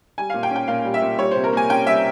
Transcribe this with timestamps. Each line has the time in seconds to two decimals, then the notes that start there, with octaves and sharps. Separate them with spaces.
0.18 G3 G#5
0.30 A#2 F5
0.43 G5
0.51 C#4
0.56 G5
0.68 A#2 F5
0.85 G3
0.94 E5
1.02 A#2
1.18 G3 C#5
1.31 C3 C5
1.44 A#4
1.53 A#3 G#5
1.69 C#4 G5
1.86 G3 E5